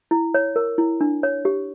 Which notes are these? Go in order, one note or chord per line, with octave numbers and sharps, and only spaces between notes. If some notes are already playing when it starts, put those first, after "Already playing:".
E4
C#5
A#4
E4
D4
C#5
G4